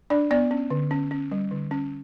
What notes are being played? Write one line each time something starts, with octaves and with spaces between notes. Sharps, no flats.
D4 D5
B3 D5
C#4
D3
C#4
C#4
G3
D3
C#4